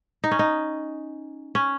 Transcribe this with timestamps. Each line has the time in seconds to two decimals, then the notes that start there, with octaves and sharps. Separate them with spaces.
0.24 D#4
0.31 C#4
0.39 D#4
1.55 C#4